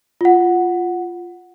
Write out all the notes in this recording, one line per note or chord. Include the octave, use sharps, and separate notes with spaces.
F4 F#5